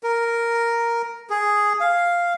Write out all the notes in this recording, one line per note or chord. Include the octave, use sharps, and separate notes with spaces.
A#4
G#4
F5